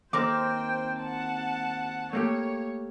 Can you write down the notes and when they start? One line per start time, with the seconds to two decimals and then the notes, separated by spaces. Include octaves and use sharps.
0.13 D#2 C4 A#4 C5 G5 D6
1.00 F#5 A5
2.13 A3 A#3 G4 C#5